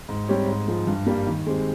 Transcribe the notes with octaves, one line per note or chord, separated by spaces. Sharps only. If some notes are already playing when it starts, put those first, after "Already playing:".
G#2
G3 C4 G4 C#5
G#2
F3 G#3
G2
G3 A#3
D#3
G#3 C4 G4